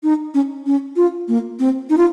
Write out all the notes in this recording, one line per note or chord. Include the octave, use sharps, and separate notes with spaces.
D#4
C#4
C#4
F4
A#3
C4
D#4
F4